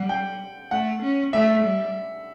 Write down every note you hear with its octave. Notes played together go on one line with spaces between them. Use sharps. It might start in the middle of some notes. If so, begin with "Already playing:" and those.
Already playing: G3 F#5
G5
A3 F#5
C#4
A3 E5
G3